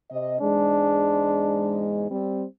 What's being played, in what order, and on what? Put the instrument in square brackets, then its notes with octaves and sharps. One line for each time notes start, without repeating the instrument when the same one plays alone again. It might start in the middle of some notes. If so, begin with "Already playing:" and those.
[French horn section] C3 D#5
[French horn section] E2 G#2 G#3 [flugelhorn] D4
[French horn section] G3 C4